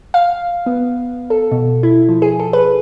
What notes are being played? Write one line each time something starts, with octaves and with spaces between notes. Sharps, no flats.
F5
B3
A4
B2
E4
F3
G#4
A4
B4